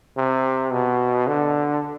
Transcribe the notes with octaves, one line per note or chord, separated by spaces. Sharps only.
C3
B2
D3